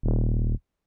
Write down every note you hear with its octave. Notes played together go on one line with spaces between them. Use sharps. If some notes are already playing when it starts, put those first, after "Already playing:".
D#1